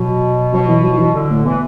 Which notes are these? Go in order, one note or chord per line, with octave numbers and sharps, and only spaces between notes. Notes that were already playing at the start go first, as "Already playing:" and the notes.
Already playing: B2 F#3
B2 F#3
E3
F#3
F#3
E3
D3
A2
B2 E3